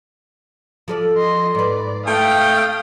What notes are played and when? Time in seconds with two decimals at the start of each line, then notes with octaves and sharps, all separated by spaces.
0.88 F3 A4 D5
1.17 D#5 C6
1.55 G#2 B4 D5
2.06 A3 F5 G5 D#6